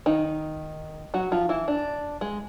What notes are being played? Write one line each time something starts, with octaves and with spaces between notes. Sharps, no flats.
D#3 D#4
F#3 F#4
F3 F4
E3 E4
D4
G#3